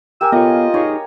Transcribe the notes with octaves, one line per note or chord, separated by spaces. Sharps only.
G4 A#4 G#5 E6
A#3 B3 F4 A4 C#5 D#5
D#4 G4 G#4 C#5